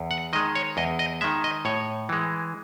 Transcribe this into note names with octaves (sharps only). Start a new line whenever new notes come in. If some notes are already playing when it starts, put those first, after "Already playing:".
Already playing: E2
F#5
D#3 G#3 D#5
C#5
E2 D#5
D#5
D#3 G#3 E5
D#5
A2 C#5
E3 G#3